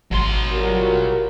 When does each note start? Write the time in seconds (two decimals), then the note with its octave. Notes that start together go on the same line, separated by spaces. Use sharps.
0.11 G#1 F#3 C6
0.51 G3 F4 F#4 A#4